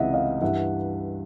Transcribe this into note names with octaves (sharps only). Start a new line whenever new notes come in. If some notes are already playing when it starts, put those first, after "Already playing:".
Already playing: C#2 C3 E3 D#5 E5 F#5
D#5 F5
G2 E3 E5 F#5